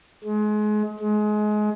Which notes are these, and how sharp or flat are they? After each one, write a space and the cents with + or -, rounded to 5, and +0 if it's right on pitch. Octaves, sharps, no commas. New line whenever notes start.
G#3 +30
G#3 +25